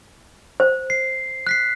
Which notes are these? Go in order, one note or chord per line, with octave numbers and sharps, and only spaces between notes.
C5
C7
F#6 B6 C7